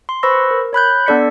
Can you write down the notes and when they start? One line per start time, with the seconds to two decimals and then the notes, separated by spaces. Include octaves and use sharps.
0.09 C6
0.23 B4 C5 B5 C#6 E6 A#6
0.51 A#4
0.73 C#5 B5 F#6 G6
1.06 B3 D4 A4 D5 B6 C#7